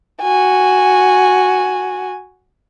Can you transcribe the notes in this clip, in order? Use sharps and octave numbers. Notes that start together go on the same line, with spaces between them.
F#4 G#5